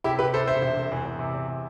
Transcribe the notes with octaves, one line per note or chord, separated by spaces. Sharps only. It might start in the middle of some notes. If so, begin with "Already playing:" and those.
C3 E4 G4
C3 G4 B4
C3 A4 C5
E1 C5 E5
E1
C3
E2
E2
C3
E2
C3